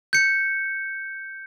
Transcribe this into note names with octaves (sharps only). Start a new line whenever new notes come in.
G6 C#7